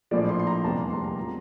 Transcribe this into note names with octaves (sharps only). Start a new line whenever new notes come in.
A#1 A2 F3 A#3 D5
C6
C6
A#5
F1 E2 C3 G3 A#3 A5
A#5
C6
A#5
F3